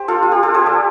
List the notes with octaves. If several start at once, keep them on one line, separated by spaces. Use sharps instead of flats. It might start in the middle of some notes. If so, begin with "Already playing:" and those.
Already playing: G4 C5
F4 A4
F4
G4
F4 A4
G4 C5
A4 D5